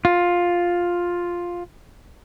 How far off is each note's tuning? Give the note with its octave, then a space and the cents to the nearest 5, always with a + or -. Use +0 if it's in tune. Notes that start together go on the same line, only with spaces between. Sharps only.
F4 +5